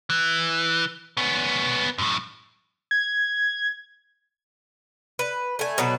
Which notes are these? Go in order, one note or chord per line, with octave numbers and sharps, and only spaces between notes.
E3
B3 C#4
F#2 A2
G#6
B4
A3 G#5
B2 F#3 F#4 B4